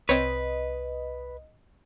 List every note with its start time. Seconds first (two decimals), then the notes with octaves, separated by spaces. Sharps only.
0.09 C2 C4 B4 C#5 D#5